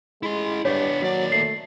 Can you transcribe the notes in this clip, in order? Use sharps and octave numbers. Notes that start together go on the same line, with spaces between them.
G#3 E4 C6
G2 B3 D4 C#5
D#2 F#3 D5
A3 C7